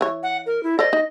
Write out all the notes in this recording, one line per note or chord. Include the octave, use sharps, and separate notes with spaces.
E3 C#5
F#5
A#4
E4
A4 C5 D5 D#5
D#4